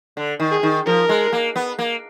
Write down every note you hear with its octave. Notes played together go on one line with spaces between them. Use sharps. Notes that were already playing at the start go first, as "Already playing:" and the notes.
D3
D#3
G#4
D#3
F3 A#4
G#3
A#3
B3
A#3